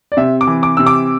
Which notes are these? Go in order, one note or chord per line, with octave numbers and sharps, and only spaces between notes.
D5
C3 E5
D6
E3
D6
C3 E6
D6